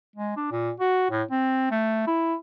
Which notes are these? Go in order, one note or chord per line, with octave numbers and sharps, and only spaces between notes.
G#3
D4
A#2
F#4
A2
C4
A3
E4